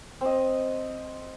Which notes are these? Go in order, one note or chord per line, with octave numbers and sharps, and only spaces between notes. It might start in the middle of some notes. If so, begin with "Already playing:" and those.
C4 D#5